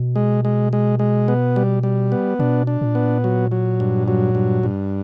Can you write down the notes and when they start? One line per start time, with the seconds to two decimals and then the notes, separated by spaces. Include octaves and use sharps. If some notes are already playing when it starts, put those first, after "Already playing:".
Already playing: B2
0.16 G#3
0.45 G#3
0.73 G#3
0.99 G#3
1.28 B3
1.56 G3
1.83 G3
2.12 B3
2.39 B2 D4
2.67 D4
2.81 A#2
2.95 B3
3.24 F#3
3.51 F#3
3.80 G2
4.08 F#3
4.35 G2
4.63 G2